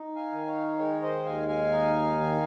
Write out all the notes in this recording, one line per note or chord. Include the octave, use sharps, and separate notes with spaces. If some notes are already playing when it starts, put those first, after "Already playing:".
Already playing: D#4
F5 G#5
D#3
C#5 F5
G#3 A#4 C#5
C5 D#5
D#2 F5 G#5
F5 G#5
D#4
D#3